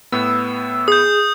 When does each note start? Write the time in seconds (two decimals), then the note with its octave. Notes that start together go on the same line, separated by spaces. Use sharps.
0.12 A2 B3 E6
0.88 G#4 D#6 G6